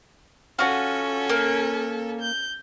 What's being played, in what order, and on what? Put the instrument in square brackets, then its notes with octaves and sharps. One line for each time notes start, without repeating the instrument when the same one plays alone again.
[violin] C#4 A4 [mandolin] F4 F#4
[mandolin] A#3
[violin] G6